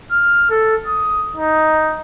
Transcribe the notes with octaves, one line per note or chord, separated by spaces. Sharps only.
F6
A4
D#6
D#4